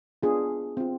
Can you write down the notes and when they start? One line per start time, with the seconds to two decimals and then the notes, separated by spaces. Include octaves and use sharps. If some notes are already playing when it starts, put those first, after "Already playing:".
0.23 B3 D4 F4 G#4
0.77 C4 F4